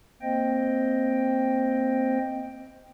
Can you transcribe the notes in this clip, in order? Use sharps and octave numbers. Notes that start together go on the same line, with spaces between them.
A#3 C4 C5 D#5 G5